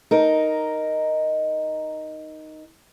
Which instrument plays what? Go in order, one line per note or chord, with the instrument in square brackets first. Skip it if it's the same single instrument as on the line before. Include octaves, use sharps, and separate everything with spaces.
[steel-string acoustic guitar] D#4 A#4